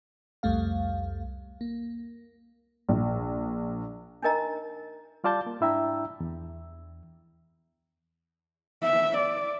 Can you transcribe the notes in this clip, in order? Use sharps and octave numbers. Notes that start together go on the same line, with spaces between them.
C2 F2 G3 A3 F5
A#3
A#1
D4 D#4 A#4 D#5 A#5
G3 F4 D5 A5 G6 A6
A#3
G#2 D4 E4 E5 G5 A#5
E2
E5
D5